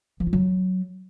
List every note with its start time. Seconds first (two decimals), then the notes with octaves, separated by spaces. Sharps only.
0.20 F3
0.26 F4
0.33 F#3